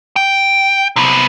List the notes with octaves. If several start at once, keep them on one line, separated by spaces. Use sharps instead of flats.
G5
C3 B3